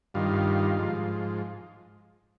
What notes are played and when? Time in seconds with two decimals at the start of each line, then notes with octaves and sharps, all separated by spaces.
0.14 G2 D#3 F4
0.79 G#2 F3